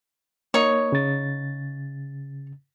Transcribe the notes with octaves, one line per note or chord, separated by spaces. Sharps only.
A#3 D#4 C#5
C#3 A6